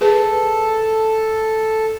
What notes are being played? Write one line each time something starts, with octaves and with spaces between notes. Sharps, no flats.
G#4 A4 B4